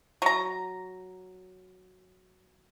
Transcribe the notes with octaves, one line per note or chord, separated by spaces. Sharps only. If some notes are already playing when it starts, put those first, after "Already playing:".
F#3 A#5